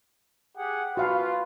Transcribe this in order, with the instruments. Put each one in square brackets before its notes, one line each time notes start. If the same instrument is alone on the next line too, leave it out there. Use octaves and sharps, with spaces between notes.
[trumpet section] G4 G#4 F#5
[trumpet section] F4 B4 [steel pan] F#4 F5 A5